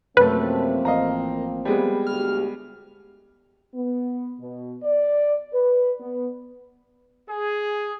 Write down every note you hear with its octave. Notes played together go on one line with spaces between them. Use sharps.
F#2 C3 F3 A3 A#3 C4 B4
A1 D#5 F5 A#5
G3 G#3 B3
D2 G4 F6
B3
B2
D5
B4
B3
G#4